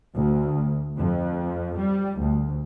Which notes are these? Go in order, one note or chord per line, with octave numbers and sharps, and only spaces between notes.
D2
F2
G3
D2